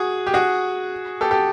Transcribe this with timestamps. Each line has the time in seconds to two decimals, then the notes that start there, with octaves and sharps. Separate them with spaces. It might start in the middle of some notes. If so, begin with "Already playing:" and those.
Already playing: F#4 G#4
0.27 G4
0.34 F#4 G#4
1.21 G4 A4
1.31 G4 A4